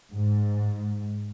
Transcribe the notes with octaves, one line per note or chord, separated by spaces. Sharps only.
G#2